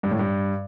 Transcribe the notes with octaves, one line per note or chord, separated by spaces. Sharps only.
G2
A2
G2